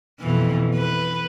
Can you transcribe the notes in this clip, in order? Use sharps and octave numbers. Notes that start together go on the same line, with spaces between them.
F2 B2 E3
B4